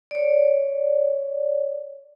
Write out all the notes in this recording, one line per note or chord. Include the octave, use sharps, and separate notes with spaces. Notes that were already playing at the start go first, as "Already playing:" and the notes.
C#5 D5